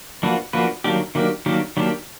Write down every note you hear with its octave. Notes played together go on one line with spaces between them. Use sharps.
F3 A#3 D4 F#4 B4
F3 A#3 D4 F#4 B4
D#3 F#3 A#3 D4 G4
D#3 F#3 A#3 D4 G4
D#3 F#3 A#3 D4 G4
D#3 F#3 A#3 D4 G4